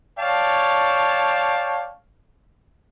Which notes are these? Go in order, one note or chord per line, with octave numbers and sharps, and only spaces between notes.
C#5 D5 F5 G5 A5